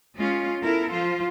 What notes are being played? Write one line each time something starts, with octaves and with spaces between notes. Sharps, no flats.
G#3 C#4 F4
B3 E4 A4 A#4
F3 F4 C5